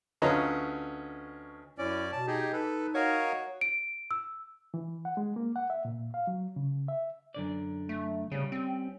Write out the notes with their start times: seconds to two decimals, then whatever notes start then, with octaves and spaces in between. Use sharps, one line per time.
0.22 D2 C#4 F4 B4 D#5 A#5
1.78 F#2 C#4 E4 D5
2.12 B2 A5
2.27 D#4 G4 G#4
2.53 D#4 A4 B4
2.95 F#4 A#4 C#5 D#5 F5
3.61 D7
4.11 E6
4.74 E3
5.05 F#5
5.17 G#3
5.36 A#3
5.56 F#5
5.70 E5
5.85 A#2
6.14 F5
6.27 F#3
6.56 C#3
6.88 E5
7.34 F#2 D3 D5
7.89 A3
8.32 C#3 G3 C#4
8.52 C4